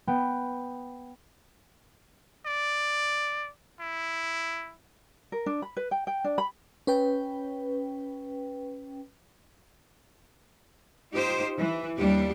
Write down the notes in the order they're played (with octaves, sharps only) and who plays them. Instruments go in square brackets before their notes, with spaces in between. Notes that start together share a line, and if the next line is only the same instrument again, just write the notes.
[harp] B3 G5
[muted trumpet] D5
E4
[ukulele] A#4
D4
B5
B4
G5
G5
D4
B5
[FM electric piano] C#4 B4 G5
[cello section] D#4 F4 G4 C5
E3
D#2 G3 D4 G4